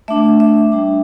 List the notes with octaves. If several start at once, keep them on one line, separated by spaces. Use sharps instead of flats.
A3 D4 E5
E5
G3 D4